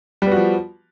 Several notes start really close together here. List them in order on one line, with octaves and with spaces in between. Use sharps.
G3 B3 F#4 F3